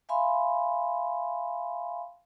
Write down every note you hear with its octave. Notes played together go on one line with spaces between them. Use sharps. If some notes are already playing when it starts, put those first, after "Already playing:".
E5 F5 G#5 B5 C6